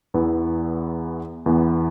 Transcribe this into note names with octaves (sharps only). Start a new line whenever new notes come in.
E2 E3 B3 E4
E2 E3 B3